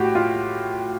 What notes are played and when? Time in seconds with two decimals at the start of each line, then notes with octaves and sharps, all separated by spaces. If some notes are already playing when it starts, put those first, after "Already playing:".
Already playing: A2 F#4 G4
0.15 F4